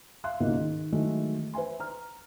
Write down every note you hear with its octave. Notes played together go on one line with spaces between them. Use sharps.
E5 F5 C6 F#6
C#2 G#2 B2 A#3
D#3
D#3 E3 F#3 G#3 A3
B4 C5 E5 G#5 C6
A#5 F6